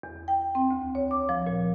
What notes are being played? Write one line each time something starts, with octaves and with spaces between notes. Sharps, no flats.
E2
G5
C4
D2
C#5
D6
F3
A#2